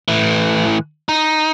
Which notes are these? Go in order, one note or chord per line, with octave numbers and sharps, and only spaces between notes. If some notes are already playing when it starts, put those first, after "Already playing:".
A2 E3
D#4